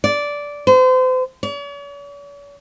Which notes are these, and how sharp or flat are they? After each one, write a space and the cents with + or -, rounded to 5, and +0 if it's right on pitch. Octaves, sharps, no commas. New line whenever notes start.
D5 -10
C5 -35
C#5 +45